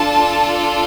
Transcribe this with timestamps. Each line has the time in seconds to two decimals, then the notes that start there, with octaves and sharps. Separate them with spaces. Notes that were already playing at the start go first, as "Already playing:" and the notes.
Already playing: D4 F4 A4 A5